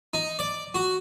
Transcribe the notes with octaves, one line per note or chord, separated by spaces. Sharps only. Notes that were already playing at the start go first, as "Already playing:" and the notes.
D#4
D5
F#4